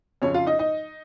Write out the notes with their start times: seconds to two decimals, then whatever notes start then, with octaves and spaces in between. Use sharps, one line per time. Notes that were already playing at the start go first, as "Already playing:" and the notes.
0.22 F2 C#3 F3 C#4 C#5
0.34 F4 F5
0.46 D#4 D#5
0.59 D#4 D#5